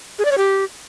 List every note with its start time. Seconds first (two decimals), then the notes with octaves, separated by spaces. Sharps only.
0.19 G#4
0.25 D5
0.31 C#5
0.38 G4